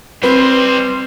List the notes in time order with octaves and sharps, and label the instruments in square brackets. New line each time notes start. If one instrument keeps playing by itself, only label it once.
[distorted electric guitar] G3 C5 [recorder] C4 [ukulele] B4